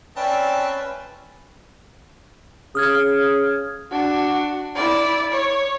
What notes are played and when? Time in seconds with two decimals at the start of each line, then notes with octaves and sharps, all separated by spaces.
0.16 C4 C#4 B4 D5 E5 G5 A5
2.75 C#3 D#6 F6 G#6
3.91 D4 F#4
4.75 E4 D5
5.32 C#5